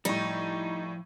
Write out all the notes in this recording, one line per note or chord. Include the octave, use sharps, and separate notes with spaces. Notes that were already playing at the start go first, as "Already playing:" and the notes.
A2 F3 G3 D#4 E4 G5